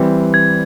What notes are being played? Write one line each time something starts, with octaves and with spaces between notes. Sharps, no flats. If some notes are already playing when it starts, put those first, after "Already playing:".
Already playing: E3 G3 C4
G#6